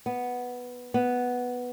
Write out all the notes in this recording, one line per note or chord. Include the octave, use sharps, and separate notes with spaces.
B3
B3